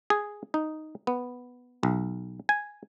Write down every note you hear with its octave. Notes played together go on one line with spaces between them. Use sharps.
G#4
D#4
B3
B1
G#5